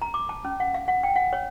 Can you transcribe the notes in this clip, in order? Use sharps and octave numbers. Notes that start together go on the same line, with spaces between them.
A#5
D6
A5
C#4
F#5
F5
F#5
G5
F#5
C#5